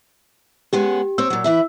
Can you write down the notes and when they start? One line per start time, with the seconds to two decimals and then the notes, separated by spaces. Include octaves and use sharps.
0.73 G#3 B3 C#4 G4
1.18 C4 C5 C#5 E6
1.30 A#2 F#3
1.44 E3 E4 E5